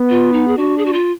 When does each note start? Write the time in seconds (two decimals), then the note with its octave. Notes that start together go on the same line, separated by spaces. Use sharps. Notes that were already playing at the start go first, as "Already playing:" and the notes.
Already playing: B3
0.10 F4
0.33 D#4
0.48 G#4
0.58 D4 F#4
0.78 G#4
0.86 F#4
0.93 F4